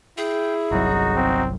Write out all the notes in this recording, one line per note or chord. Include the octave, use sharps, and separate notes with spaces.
E4 G#4 G5
G1 C2 F#3 D#4 F#4
C4